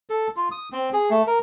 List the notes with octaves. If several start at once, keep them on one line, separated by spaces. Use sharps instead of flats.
A4
F4
D#6
C4
G#4
A3
A#4